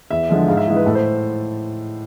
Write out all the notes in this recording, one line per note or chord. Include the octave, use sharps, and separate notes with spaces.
E2 E5
D3 F3 G#3
G#2 F5
E5
E3 G#3 G#4
B4
A2 A4
C5